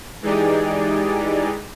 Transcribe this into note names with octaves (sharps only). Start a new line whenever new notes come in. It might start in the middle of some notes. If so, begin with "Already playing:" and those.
E3 G#3 D#4 G4 G#4 D5